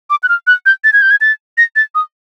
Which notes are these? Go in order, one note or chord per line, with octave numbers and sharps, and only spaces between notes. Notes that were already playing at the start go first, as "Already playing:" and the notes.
D6
F#6
F6
F#6
G6
A6
G#6
G6
G#6
A6
A#6
A6
D#6